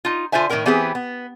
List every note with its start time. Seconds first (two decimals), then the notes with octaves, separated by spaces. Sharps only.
0.05 D#4 F4
0.32 D3 F4 F#4 C5 E5 G#5
0.49 A2 D#3 A#3 E4 A#4 G5
0.66 E3 B3 C4 G4 G#4 B4
0.95 B3